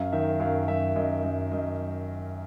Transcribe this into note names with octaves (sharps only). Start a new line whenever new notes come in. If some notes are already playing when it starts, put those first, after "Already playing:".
Already playing: F#2 F5
D#3 E5
F#2 F5
F#2 E5
F#2 D#5
F#2
F#2 D#5